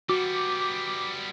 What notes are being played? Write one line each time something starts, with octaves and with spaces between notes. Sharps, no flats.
G3 B3 F#4 D6